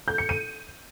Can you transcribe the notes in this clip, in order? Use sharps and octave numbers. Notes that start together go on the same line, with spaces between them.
G6
C#7
D#7